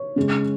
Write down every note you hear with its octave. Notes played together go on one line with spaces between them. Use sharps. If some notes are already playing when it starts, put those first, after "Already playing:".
Already playing: C#5
C#3 G#3 C#4